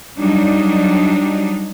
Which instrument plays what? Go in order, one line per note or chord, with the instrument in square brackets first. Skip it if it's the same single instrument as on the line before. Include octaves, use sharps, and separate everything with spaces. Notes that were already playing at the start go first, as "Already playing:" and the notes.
[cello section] F#3 G3 D4 D#4